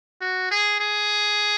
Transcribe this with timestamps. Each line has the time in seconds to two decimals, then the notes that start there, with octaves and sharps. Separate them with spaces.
0.21 F#4
0.51 G#4
0.80 G#4